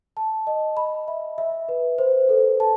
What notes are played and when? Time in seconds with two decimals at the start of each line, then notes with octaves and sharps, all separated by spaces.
0.17 A5
0.47 D#5
0.77 B5
1.08 E5
1.38 E5
1.69 B4
1.98 C5
2.29 A4
2.60 A5